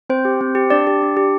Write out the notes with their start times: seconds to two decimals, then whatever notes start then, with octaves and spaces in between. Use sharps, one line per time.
0.10 C4 C5
0.25 G4
0.41 C4
0.55 G4
0.70 D4 D5
0.87 G4
1.02 D4
1.17 G4